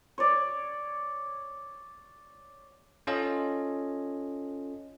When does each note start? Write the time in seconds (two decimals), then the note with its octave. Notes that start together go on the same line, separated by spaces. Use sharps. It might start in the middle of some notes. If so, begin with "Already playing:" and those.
0.18 C#5 D5
3.07 C#4 F4 A4 C#5 D#5